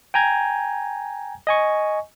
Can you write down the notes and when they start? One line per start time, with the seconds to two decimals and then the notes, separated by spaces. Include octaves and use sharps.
0.14 G5 G#5 A#5 G6 G#6
1.47 D#5 G#5 C#6